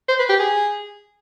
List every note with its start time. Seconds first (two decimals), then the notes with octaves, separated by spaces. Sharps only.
0.08 C5
0.19 B4
0.29 G4
0.39 G#4